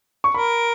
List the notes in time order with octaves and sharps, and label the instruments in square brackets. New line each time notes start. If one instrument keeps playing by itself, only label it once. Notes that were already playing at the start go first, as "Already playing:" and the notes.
[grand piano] C#6
[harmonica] A#4 [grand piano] B5